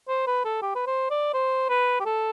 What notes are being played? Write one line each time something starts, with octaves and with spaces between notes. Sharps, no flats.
C5
B4
A4
G4
B4
C5
D5
C5
B4
G4
A4